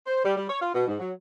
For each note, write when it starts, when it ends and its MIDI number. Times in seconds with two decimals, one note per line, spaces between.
0.07 0.23 72
0.25 0.34 55
0.37 0.49 55
0.50 0.62 73
0.62 0.72 65
0.74 0.84 47
0.88 0.97 44
1.00 1.12 54